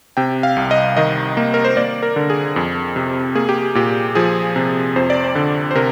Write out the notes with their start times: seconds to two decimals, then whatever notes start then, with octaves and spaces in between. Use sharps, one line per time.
0.17 C3 G5
0.43 F5
0.57 C2
0.71 D#5
0.97 D#3 D#5
1.37 A#3
1.54 A#4
1.65 C5
1.77 A#3 D5
2.03 A#4
2.16 D3
2.30 G#4
2.56 F2
2.96 C3
3.35 A#3 G#4
3.49 G4
3.75 A#2 G4
4.15 F3 G#4
4.56 C3
4.96 F2 C5
5.10 D5
5.24 C5
5.35 D3
5.71 C5
5.75 C3 A#4